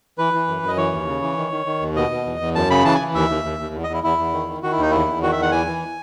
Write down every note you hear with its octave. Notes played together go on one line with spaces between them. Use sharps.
E3 B4
E3
F#2
F#2 D#5
E3 C#5
D#2
C#3
E3
D#3
D#3
D#3
D#2
B2 D#5
B2
E2
E2
F#2 A5
C#3 B5
E3 A5
G#5
E3
D#2 E5
D#2
D#2
D#2
E2
D#5
E2 E4
E2 E4
E2
D#3
D#3
D#3 F#4
E4
D#2 D#4
E2 E4
E2
D#3 F#4
E5
E2 F#5
E3 G#5
E3